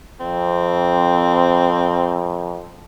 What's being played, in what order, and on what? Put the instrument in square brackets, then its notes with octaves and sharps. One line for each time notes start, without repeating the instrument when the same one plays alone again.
[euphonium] F2 [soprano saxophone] C4